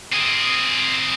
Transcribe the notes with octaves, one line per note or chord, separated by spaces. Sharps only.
C4 G#4